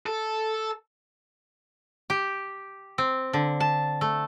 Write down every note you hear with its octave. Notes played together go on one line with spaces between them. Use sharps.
A4
G4
C4
D3
A5
A3